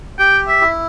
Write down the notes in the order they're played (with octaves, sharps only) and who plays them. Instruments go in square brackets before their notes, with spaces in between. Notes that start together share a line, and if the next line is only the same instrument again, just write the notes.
[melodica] G4 [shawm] G5
[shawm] E5
[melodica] E4